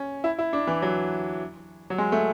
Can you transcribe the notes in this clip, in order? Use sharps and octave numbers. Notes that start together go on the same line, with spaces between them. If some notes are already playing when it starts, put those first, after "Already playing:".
Already playing: C#4
E4
E4
D4
E3
F#3
F#3
G#3
A3